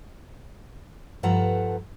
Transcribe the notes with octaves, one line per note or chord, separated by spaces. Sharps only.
G2 F3 A4 B4 F#5 A#5